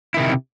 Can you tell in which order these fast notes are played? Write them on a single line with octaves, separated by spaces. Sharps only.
E4 D#3 C3